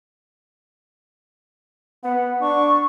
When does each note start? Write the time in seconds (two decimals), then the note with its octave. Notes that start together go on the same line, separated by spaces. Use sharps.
2.04 B3 F#5
2.41 D4 C#6